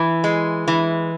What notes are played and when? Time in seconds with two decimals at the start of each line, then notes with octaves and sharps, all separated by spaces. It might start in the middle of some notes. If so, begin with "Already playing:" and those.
Already playing: E3
0.24 G#3
0.68 E3